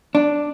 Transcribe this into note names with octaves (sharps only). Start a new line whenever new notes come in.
D4